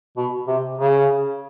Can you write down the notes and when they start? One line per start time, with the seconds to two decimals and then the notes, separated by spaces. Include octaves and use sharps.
0.17 B2
0.47 C3
0.78 C#3